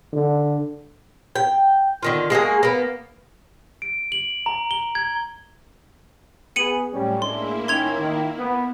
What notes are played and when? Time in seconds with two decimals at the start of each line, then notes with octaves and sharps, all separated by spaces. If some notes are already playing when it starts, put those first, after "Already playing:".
0.13 D3
1.36 G5
2.02 D3 D#3 F4
2.30 G#3 A#3 F#4 G#4
2.63 A#3 B3
3.82 D7
4.12 F#7
4.46 A#5
4.71 G7
4.95 G#6
6.56 B3 G#4 C#7 D#7 F#7
6.93 F#2 A2 G3 C#4
7.22 G#3 A#3 D4 E4 C6
7.68 D#3 C#4 C6 G#6 F7
7.98 D#3
8.39 B3